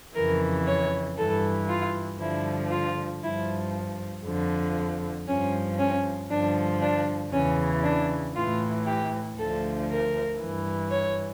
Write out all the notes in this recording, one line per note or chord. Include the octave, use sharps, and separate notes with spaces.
F2 C#3 E3 A#4
C#5
G2 E3 A4
F4
G2 D3 F3 E4
F4
G2 F3 E4
F2 D3 F3
G2 F3 C#4
C#4
G2 D3 F3 D4
D4
E2 C#3 E3 C#4
D4
A2 E3 F4
G4
D2 D3 F3 A4
A#4
G2 E3
C#5